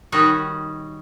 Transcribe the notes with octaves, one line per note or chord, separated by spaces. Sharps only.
D#3 G3 C#4 D#4 F#4